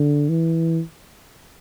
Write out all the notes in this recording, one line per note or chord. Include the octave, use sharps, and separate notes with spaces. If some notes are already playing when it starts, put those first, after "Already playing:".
Already playing: D3
E3